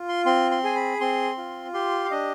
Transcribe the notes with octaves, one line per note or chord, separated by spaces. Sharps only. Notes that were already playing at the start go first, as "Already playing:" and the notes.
Already playing: F4
C6
C4 C6
C6
G#4 G#5
B5
C4 C6
F4
G4 C6
F5
D4 D#5